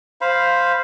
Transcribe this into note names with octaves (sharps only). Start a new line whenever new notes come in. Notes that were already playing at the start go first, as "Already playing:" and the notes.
C5 F5 B5